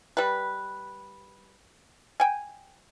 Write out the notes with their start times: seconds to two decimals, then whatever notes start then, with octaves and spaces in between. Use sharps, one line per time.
0.17 G3 B4
2.20 G5 G#5